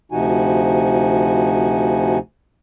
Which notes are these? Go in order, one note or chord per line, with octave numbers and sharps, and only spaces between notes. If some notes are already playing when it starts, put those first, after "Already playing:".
D2 C3 F3 D#4 F#4 G#5